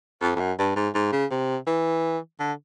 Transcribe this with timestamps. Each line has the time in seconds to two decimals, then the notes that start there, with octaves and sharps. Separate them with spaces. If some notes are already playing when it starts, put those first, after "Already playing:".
0.21 F2
0.36 F2
0.39 F#2
0.58 G2
0.76 G#2
0.95 G#2
1.12 C#3
1.31 C3
1.67 E3
2.39 D3